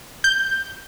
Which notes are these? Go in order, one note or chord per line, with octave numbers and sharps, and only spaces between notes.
G6